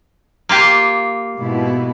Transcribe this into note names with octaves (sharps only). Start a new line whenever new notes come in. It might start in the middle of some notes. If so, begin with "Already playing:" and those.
A#3 F4 G4
G#2 B2 E4